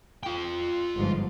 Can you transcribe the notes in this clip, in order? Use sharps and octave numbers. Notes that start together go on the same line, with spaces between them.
F4 G5
G1 G#2 F3